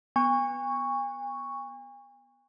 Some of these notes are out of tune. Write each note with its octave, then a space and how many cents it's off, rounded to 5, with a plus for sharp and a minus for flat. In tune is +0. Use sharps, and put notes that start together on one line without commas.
B3 +0 G#5 -40 C#6 +0